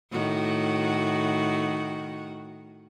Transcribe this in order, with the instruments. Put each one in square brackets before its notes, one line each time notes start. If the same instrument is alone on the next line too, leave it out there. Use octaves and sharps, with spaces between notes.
[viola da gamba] A2 D#3 F#4